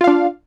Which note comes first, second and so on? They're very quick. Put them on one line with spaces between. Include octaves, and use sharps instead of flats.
F4 F5 D4